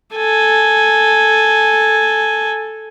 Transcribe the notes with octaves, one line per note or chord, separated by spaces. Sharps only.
A4 G#5